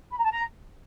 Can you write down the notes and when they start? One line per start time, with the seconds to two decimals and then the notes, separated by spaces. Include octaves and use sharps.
0.11 B5
0.18 A#5
0.24 A5
0.31 A#5